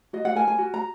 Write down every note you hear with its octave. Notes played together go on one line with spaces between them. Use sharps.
F#4 D#5
F#5
A#4 G#5
G#5
F#4
A#5